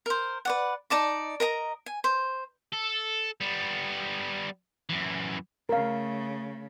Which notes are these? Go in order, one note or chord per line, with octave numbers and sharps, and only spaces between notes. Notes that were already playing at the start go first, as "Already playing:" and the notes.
A#4 C5
B4 D5 F#5
D#4 D5 A5 D6
A#4 D#5 A#5
G#5
C5
A4
G3 B3
F#2 E3
C#3 A3 A#4 F5